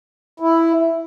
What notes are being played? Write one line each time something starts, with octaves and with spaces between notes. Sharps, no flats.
E4